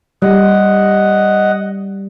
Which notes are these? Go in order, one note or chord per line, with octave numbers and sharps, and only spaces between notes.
G3 D#5 F#5